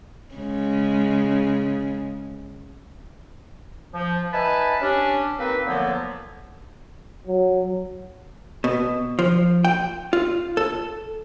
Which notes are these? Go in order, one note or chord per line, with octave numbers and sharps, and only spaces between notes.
C#3 G#3
F3
D#4 B4 E5 G#5 A5 B5
C#4 D4 G4
A#3 C4 D#4 B4
A#2 D3 F3 F#3 A#3 B3
F#3
B2
F3
G5
F4
A4